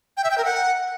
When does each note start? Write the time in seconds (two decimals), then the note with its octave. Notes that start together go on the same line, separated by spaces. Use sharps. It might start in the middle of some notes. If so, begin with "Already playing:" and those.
0.17 G5
0.24 E5
0.31 G5
0.38 A#4
0.45 F#5